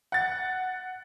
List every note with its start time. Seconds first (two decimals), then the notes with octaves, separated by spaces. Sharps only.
0.12 F#5 A6